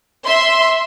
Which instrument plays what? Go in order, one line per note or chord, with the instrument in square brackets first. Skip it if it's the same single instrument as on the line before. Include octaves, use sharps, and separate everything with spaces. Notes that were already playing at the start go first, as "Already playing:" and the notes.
[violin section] E5 C6